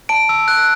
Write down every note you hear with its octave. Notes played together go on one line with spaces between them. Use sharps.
A5 D7
E6
F#6